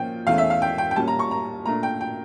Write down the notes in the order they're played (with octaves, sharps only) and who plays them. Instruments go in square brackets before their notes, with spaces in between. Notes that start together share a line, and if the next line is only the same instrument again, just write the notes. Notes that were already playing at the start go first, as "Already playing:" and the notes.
Already playing: [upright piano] A#2 F3 A#3 C#4 G5
E2 E3 A3 C#4 F5
E5
F5
G5
G5
G5
A#2 G3 C#4 A5
A#5
C#6
A#5
A#2 A3 D4 A#5
G5
G5